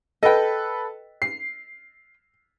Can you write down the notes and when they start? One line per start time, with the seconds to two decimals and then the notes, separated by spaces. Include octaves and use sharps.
0.23 A4 B4 D#5 G5
1.22 C7